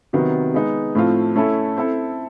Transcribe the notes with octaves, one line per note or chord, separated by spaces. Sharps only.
C3 D#3 F#3 B3
G#3 B3 D#4
A2 F3 A3 C4 F4
A3 C#4 E4 A4
C4 E4 A4